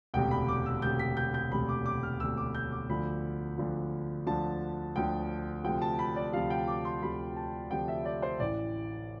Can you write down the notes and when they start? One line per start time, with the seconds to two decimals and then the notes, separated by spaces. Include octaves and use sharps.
0.14 E1 D2 C3 G5
0.31 B5
0.48 D6
0.66 E6
0.82 E1 D2 C3 G6
0.99 B6
1.17 G6
1.34 G6
1.51 E1 D2 C3 B5
1.69 D6
1.86 D6
2.03 F6
2.20 E1 D2 C3 E6
2.37 D6
2.55 G6
2.72 D6
2.89 D2 D3 F3 B5
3.58 D2 D3 F3
4.26 D2 D3 F3 A5
4.96 D2 D3 F3 G5
5.64 D2 C3 F3 G5
5.82 A5
5.99 B5
6.16 D5
6.33 D2 C3 F3 F5
6.50 G5
6.68 D6
6.85 C6
7.02 D2 C3 F3 B5
7.36 A5
7.71 D2 C3 F3 G5
7.88 E5
8.05 D5
8.22 C5
8.40 A1 A2 E3 D5